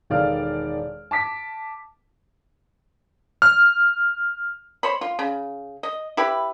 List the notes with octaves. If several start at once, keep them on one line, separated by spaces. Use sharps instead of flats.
E1 D#3 A4 D5 F5 F6
A5 D6 B6
F6
C5 C#5 B5
F4
C#3
D#5
E4 G4 B4